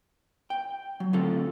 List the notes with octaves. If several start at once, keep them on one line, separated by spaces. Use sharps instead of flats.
G5
F#3
D2 C4 F4 A4